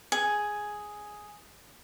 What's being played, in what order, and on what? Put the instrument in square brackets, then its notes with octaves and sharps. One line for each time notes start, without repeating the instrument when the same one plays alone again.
[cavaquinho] G#4